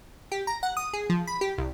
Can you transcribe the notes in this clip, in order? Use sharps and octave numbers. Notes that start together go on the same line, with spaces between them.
G4
A#5
F#5
D#6
G#4
F3
B5
G4
C2